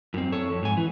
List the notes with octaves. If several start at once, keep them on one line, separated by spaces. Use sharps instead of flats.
F#2 C4
A4 C#5
F2
G#2 G#5
E3